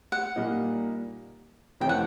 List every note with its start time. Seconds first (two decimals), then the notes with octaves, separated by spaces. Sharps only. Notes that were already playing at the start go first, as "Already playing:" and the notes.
0.12 F#5
0.36 A#2 G3 A#3 D#4
1.80 F2 C3 E3 A3 C#4 G5
1.89 F#5